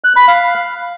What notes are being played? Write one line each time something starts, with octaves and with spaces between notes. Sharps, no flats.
F#6
B5
F5